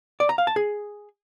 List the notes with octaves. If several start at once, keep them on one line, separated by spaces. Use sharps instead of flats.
D5
A#5
F5
A5
G#4